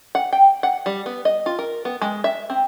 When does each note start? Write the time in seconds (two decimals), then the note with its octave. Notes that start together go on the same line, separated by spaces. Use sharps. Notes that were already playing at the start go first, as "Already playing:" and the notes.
0.15 F#5
0.33 G5
0.63 F#5
0.86 G3
1.06 B3
1.25 D#5
1.46 F4
1.59 A#4
1.85 B3
2.02 G#3
2.24 E5
2.50 C4